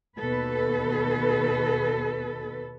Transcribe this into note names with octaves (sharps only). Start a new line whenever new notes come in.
D#2 B2 A4 B4